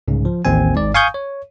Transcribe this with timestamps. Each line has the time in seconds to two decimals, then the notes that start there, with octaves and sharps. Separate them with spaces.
0.08 C2 G#2 C#3
0.25 F3
0.45 A1 D#2 C4 G#5
0.75 G#1 G#2 D5
0.94 F5 G#5 C#6 D#6 G6
1.14 C#5